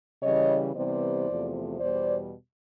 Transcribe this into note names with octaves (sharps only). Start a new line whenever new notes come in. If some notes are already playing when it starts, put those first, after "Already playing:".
C#3 E3 G3 C#5 D#5
C3 E3 G3 B3 C5 D5
E2 C3 F3 A3
E2 B2 G3 C5 D5